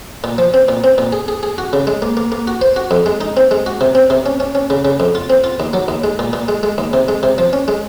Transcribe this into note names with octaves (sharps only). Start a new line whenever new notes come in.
A#2
F3
C4
A#2
C4
A#2
G#4
G#4
G#4
F#4
C#3
G#3
A#3
A#3
A#3
F#4
C5
F#4
F2
G#3
D#4
C4
G#3
F#4
C3
C4
C3
C#4
C#4
C#4
C#3
C#3
F2
F4
C4
F4
D#2
F#3
D#2
G#3
A#2
A#2
G#3
G#3
D#2
C3
G#3
C3
F3
C#4
G#3